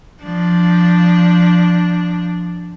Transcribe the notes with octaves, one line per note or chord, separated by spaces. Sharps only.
F3 D4